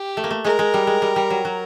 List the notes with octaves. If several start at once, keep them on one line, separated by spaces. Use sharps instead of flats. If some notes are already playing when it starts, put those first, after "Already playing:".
Already playing: G4
A3
A#3
A3
G#3 A#4
G#3
G3
G#3
G3
G3
F#3
F#3